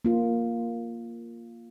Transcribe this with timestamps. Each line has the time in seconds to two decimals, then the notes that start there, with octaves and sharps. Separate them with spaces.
0.05 A#3 F4